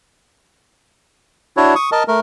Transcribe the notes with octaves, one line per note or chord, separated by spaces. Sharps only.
D4 E4 F#4 C#5
C#6 D#6
A#4 D#5 A5
A3 A#4